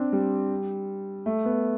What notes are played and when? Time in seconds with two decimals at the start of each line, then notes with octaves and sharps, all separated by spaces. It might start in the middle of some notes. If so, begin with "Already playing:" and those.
Already playing: C4 D4
0.13 G3
1.26 A3
1.45 B3